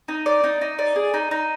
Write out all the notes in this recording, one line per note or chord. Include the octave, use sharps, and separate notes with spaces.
D#4
D5
D#4
D#4
D5
G#4
D#4
D#4